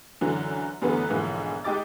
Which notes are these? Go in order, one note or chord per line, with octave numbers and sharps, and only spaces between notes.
F#2 D3 E3 F#3
F#2 D3 E3 A3 B3
B1 G#2 D3 E3 F3 A#3
G#3 D#4 G4 D6 A6